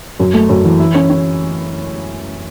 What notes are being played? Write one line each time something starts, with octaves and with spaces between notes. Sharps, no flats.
F#2
A3
F#2
E3
E4
C#4
C#4